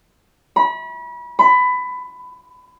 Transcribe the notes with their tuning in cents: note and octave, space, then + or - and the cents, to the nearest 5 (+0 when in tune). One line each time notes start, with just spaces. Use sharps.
B5 -35
B5 +20